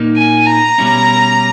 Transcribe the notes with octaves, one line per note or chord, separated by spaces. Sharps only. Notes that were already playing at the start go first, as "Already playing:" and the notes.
Already playing: A#2 A#3 D#4
G#5
A#5
B2 G3 C#4 E4